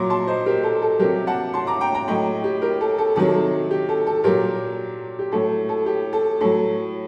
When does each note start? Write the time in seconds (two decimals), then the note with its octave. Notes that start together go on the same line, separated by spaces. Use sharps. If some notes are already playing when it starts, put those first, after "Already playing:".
Already playing: A#2 F#3 A#5 D6
0.10 A5 C6
0.27 C5 D#5
0.46 G4 A#4
0.63 A4
0.82 A4
0.99 C3 F#3 G4 A#4
1.27 F#5 A5
1.54 A5 C6
1.67 A#5 D6
1.81 G5 A#5
1.95 G5 A#5
2.08 A2 F#3 D#5 G5
2.44 G4
2.62 G4 A#4
2.81 A4
2.98 A4
3.16 C3 D#3 F#3 A4
3.71 G4
3.89 A4
4.07 A4
4.24 A#2 F#3 G4 A#4
5.19 G4
5.32 A2 F#3 A4
5.69 A4
5.86 G4
6.13 A4
6.41 A2 F#3 A4